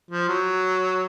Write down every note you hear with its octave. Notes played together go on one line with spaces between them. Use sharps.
F3
F#3